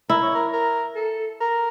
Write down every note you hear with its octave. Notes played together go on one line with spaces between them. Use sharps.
E4 A#4
C#5
A#4
A#4
A4
A#4